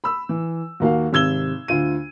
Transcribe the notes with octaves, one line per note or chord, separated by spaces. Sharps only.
B5 E6
E3
D#2 A#3 F#4 F5
G#1 C3 E6 G#6 E7 G7
D2 F4 D#7